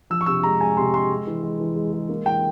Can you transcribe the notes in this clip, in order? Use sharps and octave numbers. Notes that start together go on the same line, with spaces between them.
F3 E6
C#6
C3 E6
G#3 A#5
G#3 G#5
C3 C6
G#3 C6
G#3
E3
G#3
E3
G#3
G#3
A#3
E3 G5